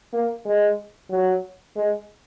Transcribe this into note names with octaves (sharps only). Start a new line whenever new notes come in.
A#3
G#3
F#3
G#3